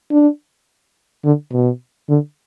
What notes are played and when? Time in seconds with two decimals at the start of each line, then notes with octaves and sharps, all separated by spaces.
0.11 D4
1.24 D3
1.52 B2
2.09 D3